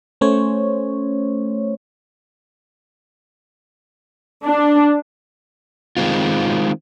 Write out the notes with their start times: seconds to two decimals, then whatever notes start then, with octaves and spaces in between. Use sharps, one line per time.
0.21 A3 C#4 C5 C#5
4.45 D4
5.97 D#3 G#3 C4 F4